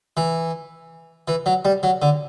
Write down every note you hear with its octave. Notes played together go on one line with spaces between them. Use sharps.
E3
E3
F#3
G3
F#3
D3